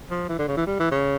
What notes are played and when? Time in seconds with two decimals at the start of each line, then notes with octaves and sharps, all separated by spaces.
0.11 F3
0.29 E3
0.39 D3
0.48 C#3
0.57 E3
0.66 G3
0.80 E3
0.91 C#3